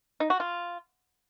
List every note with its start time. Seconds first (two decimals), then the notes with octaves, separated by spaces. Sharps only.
0.20 D#4
0.30 F#4
0.40 F4